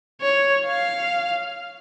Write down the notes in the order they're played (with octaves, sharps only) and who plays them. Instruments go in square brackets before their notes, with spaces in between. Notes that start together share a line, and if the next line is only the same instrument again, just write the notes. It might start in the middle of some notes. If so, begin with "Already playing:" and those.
[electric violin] C#5
F5